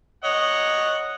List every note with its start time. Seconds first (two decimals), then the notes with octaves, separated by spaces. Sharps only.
0.24 C#5 D#5 F#5